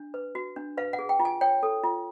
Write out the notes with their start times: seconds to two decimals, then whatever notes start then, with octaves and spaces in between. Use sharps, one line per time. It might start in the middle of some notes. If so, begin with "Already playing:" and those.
Already playing: D4
0.14 B4
0.35 F#4
0.56 D4
0.77 B4 F5
0.93 F#5
0.99 G#4
1.09 G5
1.20 F4
1.25 G#5
1.41 C#5 G5
1.63 A4
1.84 F4